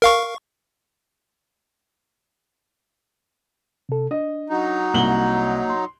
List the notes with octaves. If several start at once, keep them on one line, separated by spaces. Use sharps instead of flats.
A#4 F5 C#6
C3 A4
D4 D#5
F#3 D#4
C2 A#3 F#7 G7
C6